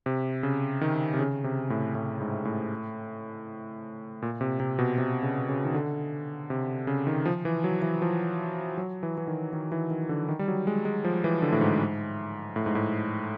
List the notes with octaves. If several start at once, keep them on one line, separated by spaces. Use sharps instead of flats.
C3
C#3
D#3
C3
C#3
C3
A2
A2
G#2
A2
A#2
C3
C3
B2
C3
C#3
C#3
D#3
D3
C3
C#3
D#3
F3
E3
F#3
E3
F3
F#3
E3
E3
D#3
D#3
E3
D#3
D3
D#3
G3
F#3
G#3
G#3
F3
E3
D3
A2
G#2
A2
G#2
A2